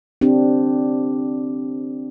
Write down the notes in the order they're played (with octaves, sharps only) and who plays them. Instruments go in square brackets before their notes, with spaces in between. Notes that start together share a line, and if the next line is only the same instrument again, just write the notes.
[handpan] C4 D4 G4